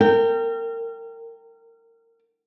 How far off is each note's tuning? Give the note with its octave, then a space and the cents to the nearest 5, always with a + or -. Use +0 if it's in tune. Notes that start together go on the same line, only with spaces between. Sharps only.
A#4 -30 G5 +0